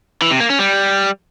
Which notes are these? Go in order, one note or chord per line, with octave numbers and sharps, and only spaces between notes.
E3
C3
A#3
C#4
G3